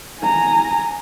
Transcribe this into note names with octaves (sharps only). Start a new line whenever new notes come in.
G#5 A#5